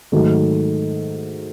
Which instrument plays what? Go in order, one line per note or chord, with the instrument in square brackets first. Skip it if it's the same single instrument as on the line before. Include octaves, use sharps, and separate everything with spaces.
[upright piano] G#2 D#3 F#3 A3